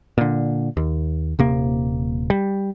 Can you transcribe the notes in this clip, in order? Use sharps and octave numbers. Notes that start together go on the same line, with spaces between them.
A#2 D3
D#2
D#1 C3 A#3
G3